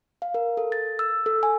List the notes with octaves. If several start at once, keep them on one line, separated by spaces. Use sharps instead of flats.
F5
A#4
A4
A6
E6
A4
G#5